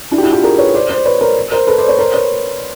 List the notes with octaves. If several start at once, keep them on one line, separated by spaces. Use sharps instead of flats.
D4 E4
G4
E4 F#4
F4 G4
G#4 A#4
B4 C#5
C5 D5
C5 D5
B4 C#5
A#4 C5
A#4 C5
A4 B4
C5 D5
B4 C#5
A#4 C5
B4 C#5